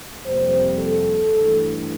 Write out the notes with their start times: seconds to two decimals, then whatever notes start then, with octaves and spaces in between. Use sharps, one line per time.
0.25 F2 C3 G3 A#3 C5
0.79 A4
1.33 G2 E3 A3